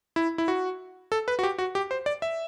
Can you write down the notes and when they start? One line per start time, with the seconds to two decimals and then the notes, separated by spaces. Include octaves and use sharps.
0.16 E4
0.38 E4
0.48 F#4
1.12 A4
1.28 B4
1.39 F#4
1.43 G4
1.58 F#4
1.75 G4
1.91 C5
2.06 D5
2.22 E5